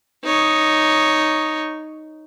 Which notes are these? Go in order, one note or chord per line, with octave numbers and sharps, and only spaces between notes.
D#4 C#5